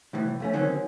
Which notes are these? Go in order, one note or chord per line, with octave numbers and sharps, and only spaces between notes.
C2 A2 E3
F2 A3 C#4
D3 D#3 F#3 C4 C#4